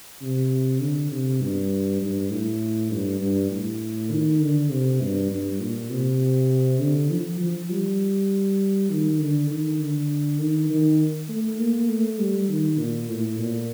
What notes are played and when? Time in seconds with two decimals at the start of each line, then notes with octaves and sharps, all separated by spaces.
0.22 C3
0.81 D3
1.12 C3
1.41 G2
2.01 G2
2.31 A2
2.91 G2
3.21 G2
3.51 A2
4.11 D#3
4.41 D3
4.71 C3
5.01 G2
5.31 G2
5.60 A#2
5.90 C3
6.80 D3
7.10 F3
7.40 F3
7.70 G3
8.90 D#3
9.20 D3
9.50 D#3
9.80 D3
10.40 D#3
10.70 D#3
11.29 A3
11.59 A#3
11.90 A3
12.19 G3
12.49 D#3
12.79 A#2
13.09 A2
13.39 A#2